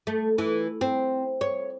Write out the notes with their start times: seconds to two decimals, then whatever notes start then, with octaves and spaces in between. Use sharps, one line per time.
0.07 A3
0.38 E3
0.81 C4
1.41 C#5